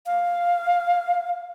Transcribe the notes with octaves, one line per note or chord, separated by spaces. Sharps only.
F5